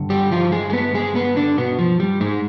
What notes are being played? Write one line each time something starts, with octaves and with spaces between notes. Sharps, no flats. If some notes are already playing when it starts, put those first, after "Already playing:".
Already playing: G2 D3
G3 G4
F3 F4
G#3 G#4
G#4
B3 B4
G#3 G#4
B3 B4
D3 D4
B2 B3
F3
G3
G#2 G#3